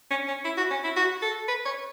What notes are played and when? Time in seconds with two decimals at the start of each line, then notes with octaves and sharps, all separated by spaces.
0.10 C#4
0.28 C#4
0.45 E4
0.57 F#4
0.71 C#4
0.84 E4
0.97 F#4
1.22 A4
1.48 B4
1.65 C#5